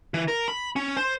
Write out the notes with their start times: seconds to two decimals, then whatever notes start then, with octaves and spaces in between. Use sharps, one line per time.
0.14 E3
0.28 A#4
0.48 B5
0.76 C#4
0.97 C5